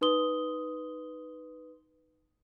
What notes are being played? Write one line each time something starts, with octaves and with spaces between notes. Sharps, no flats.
D#4 B4 C6 D#6 G7